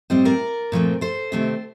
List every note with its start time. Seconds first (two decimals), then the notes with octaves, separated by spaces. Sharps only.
0.10 A2 G3 C4 C5 D#5
0.25 A#4 D5
0.72 A#2 F3 A3 C4
1.01 A4 C5
1.32 C3 D#3 A3 C4